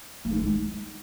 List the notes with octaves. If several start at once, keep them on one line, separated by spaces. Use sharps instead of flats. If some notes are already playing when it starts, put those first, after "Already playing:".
A#3
D#4
G#3
D#4